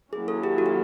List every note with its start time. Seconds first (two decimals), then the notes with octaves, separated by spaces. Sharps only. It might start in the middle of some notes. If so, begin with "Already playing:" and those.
0.13 D#3 F#3 A#3 C#4 E4 G#4
0.28 A4
0.43 G4
0.58 F#4
0.66 G4